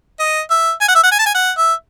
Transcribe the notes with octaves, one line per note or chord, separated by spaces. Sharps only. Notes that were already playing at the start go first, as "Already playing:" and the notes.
D#5
E5
G#5
F#5
E5
F#5
G#5
A5
G#5
F#5
E5